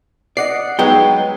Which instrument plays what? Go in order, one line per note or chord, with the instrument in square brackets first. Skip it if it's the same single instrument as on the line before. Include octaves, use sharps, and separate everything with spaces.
[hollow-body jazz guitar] D5 [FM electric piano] D#5 F#5 C7
[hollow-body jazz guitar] F#3 G#3 B3 [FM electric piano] D#4 [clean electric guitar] G5